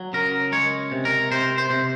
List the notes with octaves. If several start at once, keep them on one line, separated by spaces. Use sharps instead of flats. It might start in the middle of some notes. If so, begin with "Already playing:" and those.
Already playing: F#3
C#3 A#4
G#3 C#5
C3
A#4
C3 C5
C5
C3